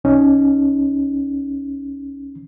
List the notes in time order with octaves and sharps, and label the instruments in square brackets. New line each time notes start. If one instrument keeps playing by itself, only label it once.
[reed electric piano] C2 C#4 D#4